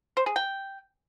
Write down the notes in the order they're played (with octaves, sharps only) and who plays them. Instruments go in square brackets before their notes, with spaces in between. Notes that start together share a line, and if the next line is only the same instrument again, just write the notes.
[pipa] C5
G#4
G5